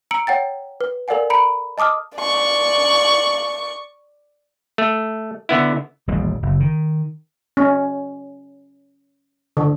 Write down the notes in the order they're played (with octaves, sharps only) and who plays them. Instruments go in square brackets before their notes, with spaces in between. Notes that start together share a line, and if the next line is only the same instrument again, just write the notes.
[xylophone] A#5 E6 C#7 D7 F#7
C#5 F#5 G5 A6
B4
A4 A#4 D5 F5 F#5 G#5
A#5 B5 C#7 D7
D#5 A5 D6 D#6 F6
[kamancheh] D5 C#6
[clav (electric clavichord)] A3
D3 B3 E4
[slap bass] D#1 A1 G3
F#1
D#3
[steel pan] C#4
D3